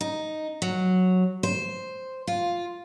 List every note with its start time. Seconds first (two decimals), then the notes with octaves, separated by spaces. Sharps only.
0.01 D#4
0.62 F#3
1.43 C5
2.27 F4